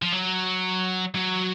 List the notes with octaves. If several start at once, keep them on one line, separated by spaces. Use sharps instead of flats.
F3
F#3
F#3